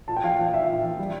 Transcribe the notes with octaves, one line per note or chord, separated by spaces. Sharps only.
A#2 A5
G5
F3 F5
G5
F3
A#2 E5
A#2
F3
G3